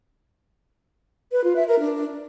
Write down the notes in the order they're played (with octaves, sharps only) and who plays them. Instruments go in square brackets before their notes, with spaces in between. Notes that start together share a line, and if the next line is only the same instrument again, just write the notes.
[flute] B4
F4
E5
A#4
D4